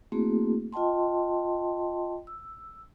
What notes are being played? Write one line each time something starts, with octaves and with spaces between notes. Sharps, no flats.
A3 A#3 C4 E4 F#4 G#4
F4 D#5 G5 A5 C6
E6